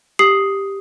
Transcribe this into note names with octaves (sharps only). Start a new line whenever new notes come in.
G4 D#6 C7 F#7